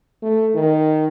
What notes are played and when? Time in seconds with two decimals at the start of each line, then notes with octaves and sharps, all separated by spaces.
0.22 A3
0.55 D#3